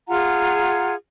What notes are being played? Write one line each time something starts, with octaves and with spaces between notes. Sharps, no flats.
F4 G#4 F#5 A#5